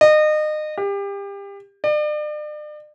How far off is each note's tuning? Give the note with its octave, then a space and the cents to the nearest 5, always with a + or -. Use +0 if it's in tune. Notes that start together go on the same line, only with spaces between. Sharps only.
D#5 -30
G4 +30
D5 +40